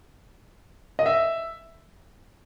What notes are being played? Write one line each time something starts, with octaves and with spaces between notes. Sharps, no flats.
D#5
E5